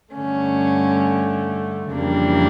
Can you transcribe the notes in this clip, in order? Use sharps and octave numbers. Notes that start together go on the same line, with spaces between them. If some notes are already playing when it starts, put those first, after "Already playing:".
G2 D3 A3 C#4
F2 C#3 E3 G3 A#3 D4